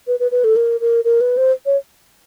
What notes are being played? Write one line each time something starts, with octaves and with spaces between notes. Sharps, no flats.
B4
B4
B4
A4
A#4
A#4
A#4
B4
C5
C#5